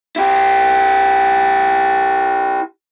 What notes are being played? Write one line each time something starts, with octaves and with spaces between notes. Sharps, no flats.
E4 G4